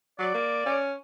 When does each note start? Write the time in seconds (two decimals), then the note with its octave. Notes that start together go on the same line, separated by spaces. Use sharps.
0.19 F#3 D5
0.34 A#3
0.66 C#4